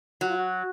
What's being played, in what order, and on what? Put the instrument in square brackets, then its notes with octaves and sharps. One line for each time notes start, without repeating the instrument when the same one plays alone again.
[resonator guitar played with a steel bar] F#3 [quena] F#4
[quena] F4
F#4